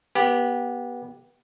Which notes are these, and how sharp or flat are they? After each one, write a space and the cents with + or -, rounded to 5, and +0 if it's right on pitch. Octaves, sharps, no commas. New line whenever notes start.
B3 -20 G4 +0